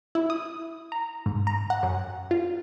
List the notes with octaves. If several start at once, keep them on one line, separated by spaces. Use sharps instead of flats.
E4
D#6
A#5
G#2
A#5
F#5
F#2
F4